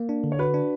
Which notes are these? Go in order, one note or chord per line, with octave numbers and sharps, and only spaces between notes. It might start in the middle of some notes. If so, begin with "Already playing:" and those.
Already playing: A#3
D4
D3
C#5
F#4 B4
D4